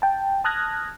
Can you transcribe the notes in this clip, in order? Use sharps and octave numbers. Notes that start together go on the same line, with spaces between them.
G5 A5
A5 D#6 F6 F#6 G#6 A#6